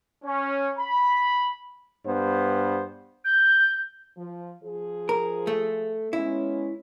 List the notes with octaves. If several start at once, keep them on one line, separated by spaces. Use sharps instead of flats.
C#4
B5
G2 B3 C5
G6
F3
F3 G#4
A#4
A3
G#3 B3 C#4 E4